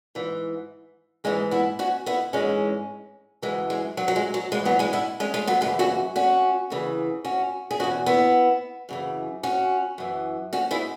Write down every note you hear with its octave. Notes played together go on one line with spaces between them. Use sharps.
G#2 E3
G#2 E3 G#3 C#4
B3 E4
C#4 F#4
B3 E4
G#2 E3 G#3 C#4
F#2 C#3 E3 G#3
G#3
F#3
F#3
G#3
F#3
G#2 E3 G#3
F#3 B3
G#3 C#4
B3 E4
G#3 C#4
G#3 C#4
F#3 B3
F#2 C#3 E3 G#3 C#4
C#4 F#4
C#4 F#4
E2 C#3 E3
C#4 F#4
G#4
E2 B2 C#4 F#4
B3 E4
F#2 C#3 E3
C#4 F#4
F#2 E3
C#4 F#4
E4 G#4